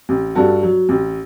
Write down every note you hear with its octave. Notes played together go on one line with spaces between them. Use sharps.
A1
G2 F#4 A4
F#3
A1